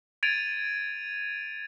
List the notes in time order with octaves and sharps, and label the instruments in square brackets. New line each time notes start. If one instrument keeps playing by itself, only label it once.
[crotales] G#6 A6 D7 D#7 F7